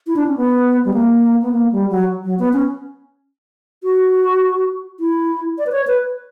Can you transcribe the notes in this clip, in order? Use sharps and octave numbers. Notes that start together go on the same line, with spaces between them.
E4
D4
C#4
B3
G3
A#3
B3
A#3
G3
F#3
F#3
B3
C#4
F#4
E4
D5
B4
C#5
B4